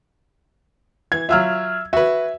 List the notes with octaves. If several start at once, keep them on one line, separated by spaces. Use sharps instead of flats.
E3 G#6
F#3 F4 E5 E6 F6
F#4 B4 E5